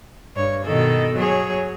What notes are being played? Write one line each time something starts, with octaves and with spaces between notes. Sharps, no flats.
G2 C#5
B2 D#3 A4
F#3 G#4 C#5